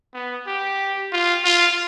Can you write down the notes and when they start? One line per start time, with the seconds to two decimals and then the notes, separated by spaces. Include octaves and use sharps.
0.14 B3
0.47 G4
1.12 F4
1.44 F4